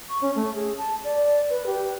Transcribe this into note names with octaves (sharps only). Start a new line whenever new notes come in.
C#6
C#4
A3
G#4
A5
D5
B4
G4